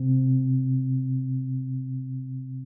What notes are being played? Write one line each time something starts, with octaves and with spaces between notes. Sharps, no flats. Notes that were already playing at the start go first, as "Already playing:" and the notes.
Already playing: C3 C4